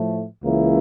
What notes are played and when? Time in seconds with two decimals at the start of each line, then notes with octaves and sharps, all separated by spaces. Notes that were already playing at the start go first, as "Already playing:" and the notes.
Already playing: A2 F3 A3
0.43 C#2 C#3 E3 A#3 E4